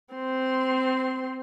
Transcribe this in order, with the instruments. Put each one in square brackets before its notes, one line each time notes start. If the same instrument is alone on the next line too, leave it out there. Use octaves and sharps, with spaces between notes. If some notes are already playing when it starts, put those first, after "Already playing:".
[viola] C4 C6